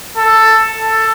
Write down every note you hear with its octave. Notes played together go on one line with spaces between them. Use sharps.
A4
A4